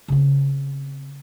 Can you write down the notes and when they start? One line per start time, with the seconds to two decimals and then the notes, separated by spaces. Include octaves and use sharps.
0.08 C#3 C4